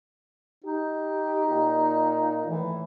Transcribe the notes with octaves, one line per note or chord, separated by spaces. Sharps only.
D#4 G4
A#2
A2 E3